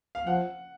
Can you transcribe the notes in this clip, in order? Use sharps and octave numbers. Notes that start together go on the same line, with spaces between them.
F5
F3 F#5